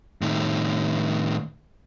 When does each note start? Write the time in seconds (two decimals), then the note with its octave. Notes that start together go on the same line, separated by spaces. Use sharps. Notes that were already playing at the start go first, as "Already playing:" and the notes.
0.21 A2 D#3